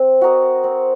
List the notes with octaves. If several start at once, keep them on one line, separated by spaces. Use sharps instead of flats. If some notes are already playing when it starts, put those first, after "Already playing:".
Already playing: C4
F#4 A#4 D#5
C4